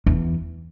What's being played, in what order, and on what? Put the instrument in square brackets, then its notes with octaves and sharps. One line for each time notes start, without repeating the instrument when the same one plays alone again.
[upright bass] E2